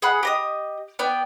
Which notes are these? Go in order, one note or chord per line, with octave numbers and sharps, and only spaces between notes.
G#4 F#5 B5 F#6
G4 D#5 D#6
B3 D5 G5